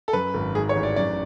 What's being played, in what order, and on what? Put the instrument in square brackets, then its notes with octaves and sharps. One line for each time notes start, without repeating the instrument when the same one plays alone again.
[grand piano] A4
F#2 B4
G#1
G#2 G#4
C#5
A1
D5
F#2 D5